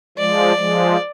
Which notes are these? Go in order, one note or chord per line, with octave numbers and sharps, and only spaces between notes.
F3 G#3 D5
F3 G#3